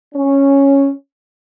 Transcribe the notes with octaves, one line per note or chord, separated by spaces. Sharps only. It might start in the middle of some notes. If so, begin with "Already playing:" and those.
C#4